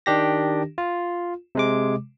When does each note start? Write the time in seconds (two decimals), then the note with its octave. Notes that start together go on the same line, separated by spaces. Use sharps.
0.06 D#3 D4 G4 A#6
0.78 F4
1.55 C3 G#3 D6